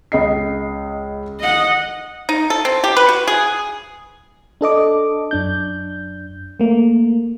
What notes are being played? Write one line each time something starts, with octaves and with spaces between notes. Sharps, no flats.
C#2 D#5 C7
D#5 F#5
D#4
A4
C4
G4
B4
F#4
G#4
D4 A4 D#5 D6
F#2 D4 G6
A3 A#3